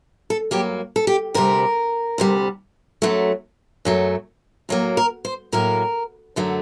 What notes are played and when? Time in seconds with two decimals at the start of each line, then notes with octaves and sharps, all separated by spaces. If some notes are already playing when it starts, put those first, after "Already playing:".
0.30 A4
0.51 G2 F#3 A#3 G4
0.96 A4
1.07 G4
1.34 D2 C3 G3 A#4
2.18 D2 C3 G3
3.02 F#2 F#3 A3
3.85 F#2 F#3 A3
4.69 A2 F#3 A#3
4.97 A#4
5.25 C5
5.52 A2 F#3 A#3 A#4
6.36 F#2 D3 F#3 A3